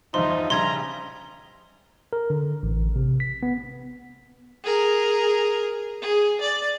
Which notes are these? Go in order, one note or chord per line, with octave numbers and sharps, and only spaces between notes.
E2 G2 F3 D#4 C5 D#5 E5 C6
A#1 C#3 G3 A#5 C6 G#6 G7
A#4
D3
A1
C3
B6
B3
G#4 A#4
G#4
D5